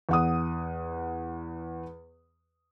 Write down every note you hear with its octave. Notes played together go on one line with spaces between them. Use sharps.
E2 F#5 D#6